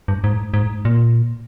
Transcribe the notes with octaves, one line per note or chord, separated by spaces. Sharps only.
G2
G#2
G#2
A#2